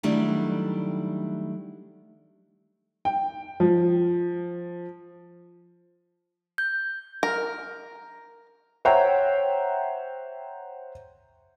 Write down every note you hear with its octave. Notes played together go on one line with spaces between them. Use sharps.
D#3 F#3 G3 A3 D4 E4
G5
F3
G6
A#4
C5 C#5 E5 F#5 G5 A#5